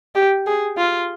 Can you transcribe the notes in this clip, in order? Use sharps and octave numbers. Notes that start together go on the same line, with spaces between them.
G4
G#4
F4